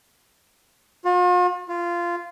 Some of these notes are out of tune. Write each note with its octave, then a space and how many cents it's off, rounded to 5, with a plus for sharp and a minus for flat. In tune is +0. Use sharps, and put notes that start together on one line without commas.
F4 +45
F4 -15